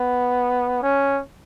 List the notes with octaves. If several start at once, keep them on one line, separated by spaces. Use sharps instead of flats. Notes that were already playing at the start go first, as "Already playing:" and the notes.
Already playing: B3
C#4